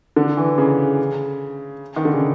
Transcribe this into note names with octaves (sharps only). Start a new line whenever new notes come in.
D3
E3
C#3
D#3
D3
C#3